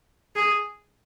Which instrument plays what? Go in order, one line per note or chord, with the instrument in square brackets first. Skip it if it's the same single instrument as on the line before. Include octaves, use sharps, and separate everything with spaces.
[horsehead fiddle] G#4